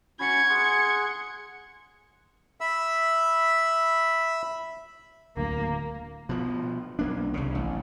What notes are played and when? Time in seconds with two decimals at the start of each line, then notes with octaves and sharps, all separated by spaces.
0.20 C#4 F#4 B5 G#6 C#7
0.50 G#4 F#5 C6
2.61 E5 B5 E6
5.37 D1 D2 A#3
6.29 B2 F3
6.99 B1 A#3 D4
7.34 C2 C#3
7.55 A1